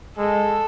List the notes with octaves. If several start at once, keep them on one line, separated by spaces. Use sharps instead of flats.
G#3 A4